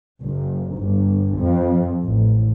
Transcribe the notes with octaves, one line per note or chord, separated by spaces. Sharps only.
F#1
G1
F2
A1